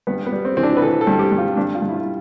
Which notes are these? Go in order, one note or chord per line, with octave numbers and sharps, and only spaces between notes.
G2 B3
B3
G3
C4
E3 C4
D4
B4
E3 A4
A4
G2
G4
G2
F4
G2 D4
F4
G2
E4
F4